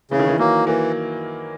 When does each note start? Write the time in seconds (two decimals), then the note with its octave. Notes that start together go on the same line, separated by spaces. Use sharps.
0.11 C#3 E3
0.19 D#3
0.28 E3
0.39 F#3 A#3
0.66 E3 A#3